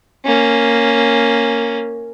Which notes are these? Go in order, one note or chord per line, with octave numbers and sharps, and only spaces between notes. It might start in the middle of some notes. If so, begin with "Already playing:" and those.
A#3 C#4